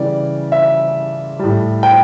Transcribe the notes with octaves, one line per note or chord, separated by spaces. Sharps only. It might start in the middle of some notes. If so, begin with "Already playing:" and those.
Already playing: C#3 E3 G3 D5
E5
A2 G3
G5